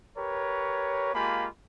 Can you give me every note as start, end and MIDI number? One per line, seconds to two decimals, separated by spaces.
0.17 1.13 67
0.17 1.13 70
0.17 1.13 71
0.17 1.13 73
1.14 1.47 56
1.14 1.47 58
1.14 1.47 65
1.14 1.47 67
1.14 1.47 80
1.14 1.47 83